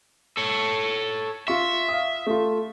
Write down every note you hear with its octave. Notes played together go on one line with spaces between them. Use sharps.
A4 C#5
F4 E5 C#6
F5 D#6
A3 F4